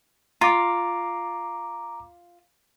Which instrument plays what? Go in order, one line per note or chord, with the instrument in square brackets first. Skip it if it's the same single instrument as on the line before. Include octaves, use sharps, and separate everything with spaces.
[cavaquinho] F4 [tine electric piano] A#5 D6